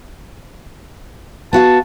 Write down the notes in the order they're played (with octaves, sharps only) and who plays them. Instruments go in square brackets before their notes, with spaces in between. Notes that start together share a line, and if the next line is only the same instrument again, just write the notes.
[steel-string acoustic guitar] B3 F#4 F5 [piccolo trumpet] A5